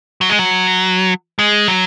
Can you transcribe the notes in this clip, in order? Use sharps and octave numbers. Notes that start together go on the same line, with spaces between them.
F#3
G#3
F#3
G#3
F#3